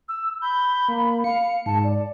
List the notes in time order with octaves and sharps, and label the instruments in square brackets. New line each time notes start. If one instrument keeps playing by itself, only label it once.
[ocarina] E6
[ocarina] B5 [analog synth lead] G6
[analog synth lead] A#3
[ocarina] F5 [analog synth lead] C#7
[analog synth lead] G#2 [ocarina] A5
[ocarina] D5